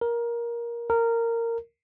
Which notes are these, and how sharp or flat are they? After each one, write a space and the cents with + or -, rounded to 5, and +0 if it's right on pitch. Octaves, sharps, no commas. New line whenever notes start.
A#4 +15
A#4 -15